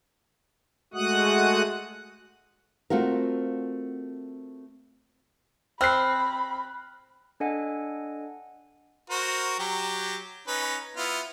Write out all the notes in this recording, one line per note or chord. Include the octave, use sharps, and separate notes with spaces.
G#3 A3 F#4 F#5 D#6 F#6
A3 C4 F4 F#4 A#4
C4 B5 F6 F#6 C7
D4 A4 D#5 F#5 G#5
F#4 A#4 C5
F#3 G4
C#4 D#4 B4
B3 E4 F4